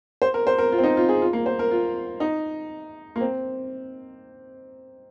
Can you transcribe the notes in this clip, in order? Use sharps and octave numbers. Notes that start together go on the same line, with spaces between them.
C5
A#4
C5
A#4
F4
C4
D#4
F4
G#4
F4
A#3
C5
A#4
F4
D#4
A#3
C4